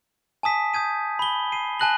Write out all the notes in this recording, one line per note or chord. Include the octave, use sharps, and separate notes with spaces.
G#5 A5 D#6 B6
D#6 G6 G#6 D#7
B5 G7
C7 D#7
G#5 A5 F#6 A#6 F#7